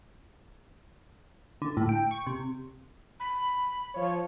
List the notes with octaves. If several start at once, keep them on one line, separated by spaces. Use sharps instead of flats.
D3
A2
G5
C#6
C3
B5
F3 C#5